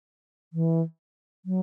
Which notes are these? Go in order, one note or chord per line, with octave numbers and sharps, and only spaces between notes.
E3
F#3